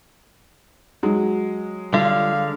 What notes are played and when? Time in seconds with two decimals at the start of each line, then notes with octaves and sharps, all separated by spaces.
1.03 F#3 G#3
1.94 D3 G3 F4 F5